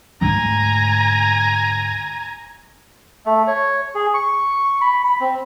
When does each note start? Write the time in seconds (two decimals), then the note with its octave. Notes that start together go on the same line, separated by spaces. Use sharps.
0.21 D2 G#2 G#5 A#5
3.26 A3
3.47 C#5
3.95 G#4
4.14 C#6
4.81 B5
5.04 B5
5.21 C4